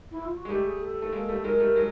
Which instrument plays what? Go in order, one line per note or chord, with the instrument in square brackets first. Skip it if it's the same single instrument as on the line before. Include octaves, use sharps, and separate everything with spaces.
[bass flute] E4
F4
F#4
[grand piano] G#3
[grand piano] G3 A3 [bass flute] G4
[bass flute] G#4
A4
[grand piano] A3
G#3 A#3
G3 A3
[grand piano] F#3 G#3 [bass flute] A#4
[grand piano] G3 A3
F#3 G#3